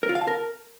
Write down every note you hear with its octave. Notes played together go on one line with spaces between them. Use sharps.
A#4
F4
F5
A5
A#4